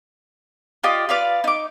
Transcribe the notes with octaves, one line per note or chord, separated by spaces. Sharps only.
F4 G4 D5 D#5
F4 B4 D5 F5
D#4 D6